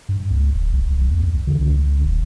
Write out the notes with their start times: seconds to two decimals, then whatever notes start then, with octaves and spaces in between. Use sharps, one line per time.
0.09 G2
0.30 C#2
0.55 D1
0.73 B1
0.91 C2
1.11 E2
1.24 E2
1.47 D3
1.61 C#2
1.85 C#2
2.05 D#1